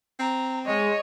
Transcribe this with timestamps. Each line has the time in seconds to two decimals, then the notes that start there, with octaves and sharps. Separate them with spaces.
0.19 C4 A#5
0.66 G#3 C#5 D#5